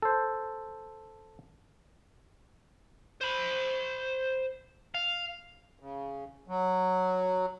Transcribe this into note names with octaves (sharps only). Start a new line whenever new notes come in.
A4 C5
C5 B5
F5
C#3
F#3